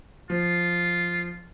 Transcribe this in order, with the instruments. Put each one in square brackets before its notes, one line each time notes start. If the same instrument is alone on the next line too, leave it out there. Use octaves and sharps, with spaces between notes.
[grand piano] F3 [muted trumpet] F4